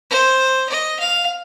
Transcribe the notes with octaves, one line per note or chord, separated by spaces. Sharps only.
C5
D#5
F5